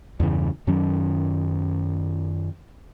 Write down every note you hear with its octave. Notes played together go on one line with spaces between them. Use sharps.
E2 G2 C#3 E3
F#2 D#3 F#3 C#4